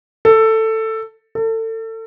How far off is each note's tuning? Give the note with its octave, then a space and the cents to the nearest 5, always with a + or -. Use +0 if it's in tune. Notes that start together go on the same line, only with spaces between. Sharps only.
A4 +10
A4 +30